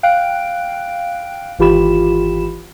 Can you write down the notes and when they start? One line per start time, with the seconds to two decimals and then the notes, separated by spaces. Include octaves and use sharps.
0.03 F5 G5 F#6 D7
1.59 G#1 E3 F4 G4 B5 E7